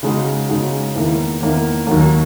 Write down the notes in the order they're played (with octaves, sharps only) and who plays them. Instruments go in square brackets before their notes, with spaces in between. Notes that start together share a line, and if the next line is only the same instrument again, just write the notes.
[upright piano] C#3 G#3 D#4 F#4
C#3 G#3 D#4 F#4
E2 D#3 A#3 E4
E2 D#3 A#3 E4
D#2 D#3 F#3 A#3